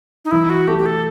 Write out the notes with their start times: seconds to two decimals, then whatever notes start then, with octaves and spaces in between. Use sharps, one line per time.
0.25 D#4
0.31 E3 E4
0.50 F#4
0.68 A3 G4
0.78 G4
0.86 A4